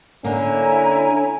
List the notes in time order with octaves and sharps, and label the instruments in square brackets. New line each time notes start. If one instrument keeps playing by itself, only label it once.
[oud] D3 A#3 [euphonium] C#4 [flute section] E4 G#5 A#5